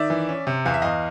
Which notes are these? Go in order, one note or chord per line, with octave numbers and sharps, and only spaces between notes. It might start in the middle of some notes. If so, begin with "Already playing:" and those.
Already playing: D#3 D5 E5
E3
C#4
C3
E2 F5
E5
E2 D#5 F5